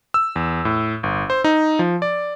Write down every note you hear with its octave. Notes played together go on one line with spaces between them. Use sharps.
E6
E2
A2
G1
C5
D#4
F3
D5